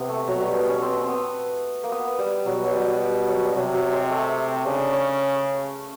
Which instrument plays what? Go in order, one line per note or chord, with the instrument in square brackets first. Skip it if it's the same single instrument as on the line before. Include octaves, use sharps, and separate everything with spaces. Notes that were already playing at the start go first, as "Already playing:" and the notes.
Already playing: [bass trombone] C3 [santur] B3
[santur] A3
[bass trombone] B2 [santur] F#3
[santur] G3
B3
C#4
C4
C4
B3
A#3
B3
G3
[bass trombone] B2 [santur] F#3
[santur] F#3
G3
G3
F#3
G3
[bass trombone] C3 [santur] F#3
[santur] F#3
G#3
A3
[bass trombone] C#3 [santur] D4
[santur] C#4